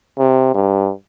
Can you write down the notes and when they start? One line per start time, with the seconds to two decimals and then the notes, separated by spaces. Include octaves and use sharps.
0.18 C3
0.54 G2